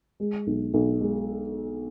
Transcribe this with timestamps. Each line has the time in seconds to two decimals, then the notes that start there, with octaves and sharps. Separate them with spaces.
0.20 G#3
0.47 B1
0.74 B1
1.00 G#3